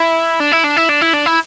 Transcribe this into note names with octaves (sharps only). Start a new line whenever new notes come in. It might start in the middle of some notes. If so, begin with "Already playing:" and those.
Already playing: E4
D4
E4
D4
E4
D4
E4
D4
E4